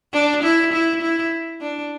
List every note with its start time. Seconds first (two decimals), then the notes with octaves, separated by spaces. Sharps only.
0.13 D4
0.43 E4
0.72 E4
1.02 E4
1.61 D4